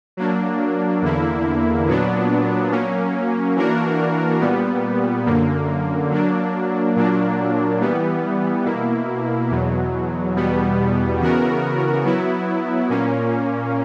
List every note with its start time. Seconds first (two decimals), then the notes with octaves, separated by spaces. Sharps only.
0.17 F#3 A#3 D4
1.02 E2 D3 A#3 E4
1.87 A#2 F#3 B3 D4
2.71 F#3 A#3 C#4
3.56 E3 A#3 D4 F#4 A#4
4.41 A#2 G3 B3
5.26 F#2 D3 A#3
6.11 F#3 A#3 D4
6.96 A#2 F#3 A#3 D4
7.81 E3 G3 B3
8.65 B2 A#3 E4
9.51 E2 B2 F#3
10.35 E2 B2 G3 B3
11.20 C#3 E3 B3 F#4 A#4
12.05 F#3 B3 E4
12.90 A#2 A#3 C#4